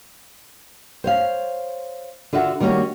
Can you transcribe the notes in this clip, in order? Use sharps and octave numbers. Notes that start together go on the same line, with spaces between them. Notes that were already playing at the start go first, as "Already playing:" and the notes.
C5 C#5 F5
D3 F4 F#4 E5 F#5
D#3 G3 A#3 C#4 F#4